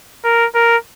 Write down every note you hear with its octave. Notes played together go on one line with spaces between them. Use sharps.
A#4
A#4